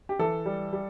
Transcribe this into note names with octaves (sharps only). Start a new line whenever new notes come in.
G4
E3 A4
G3
G3